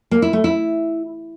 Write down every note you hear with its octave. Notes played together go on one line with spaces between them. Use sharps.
A#3
E4
A3
E4